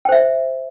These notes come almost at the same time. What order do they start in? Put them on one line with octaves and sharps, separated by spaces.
G5 C5 E5